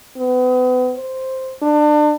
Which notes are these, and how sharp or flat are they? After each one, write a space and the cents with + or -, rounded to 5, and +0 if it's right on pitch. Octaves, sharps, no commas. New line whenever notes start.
B3 +35
C5 +0
D4 +30